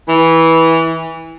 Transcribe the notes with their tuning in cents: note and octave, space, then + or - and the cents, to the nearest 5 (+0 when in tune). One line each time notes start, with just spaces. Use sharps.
E3 -15